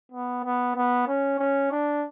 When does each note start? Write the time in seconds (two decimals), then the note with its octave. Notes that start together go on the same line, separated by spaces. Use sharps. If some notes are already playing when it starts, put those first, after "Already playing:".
0.12 B3
0.44 B3
0.76 B3
1.07 C#4
1.39 C#4
1.71 D4